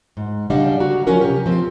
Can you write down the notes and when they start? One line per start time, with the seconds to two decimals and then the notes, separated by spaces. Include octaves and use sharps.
0.17 G#2
0.50 C#3 G3 D4 D#5 F5 F#5
0.80 D3 F#4 A#5
1.07 F3 F#3 C#4 F4 A#4 C#5
1.21 C3 G4
1.46 F3 C4